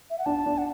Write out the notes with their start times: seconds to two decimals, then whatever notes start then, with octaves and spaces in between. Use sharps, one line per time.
0.10 E5
0.19 F#5
0.26 D4 A5
0.46 D4
0.58 F#5